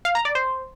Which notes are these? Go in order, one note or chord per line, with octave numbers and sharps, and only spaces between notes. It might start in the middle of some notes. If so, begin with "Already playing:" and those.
F5
A#5
D5
C5